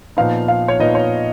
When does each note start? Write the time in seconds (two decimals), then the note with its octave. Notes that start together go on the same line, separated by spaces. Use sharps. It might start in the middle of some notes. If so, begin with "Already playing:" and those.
0.17 A#2 F3 B3 D#4 F5
0.48 F5
0.68 C#5
0.79 A#2 F3 B3 D#4 D#5
0.95 C#5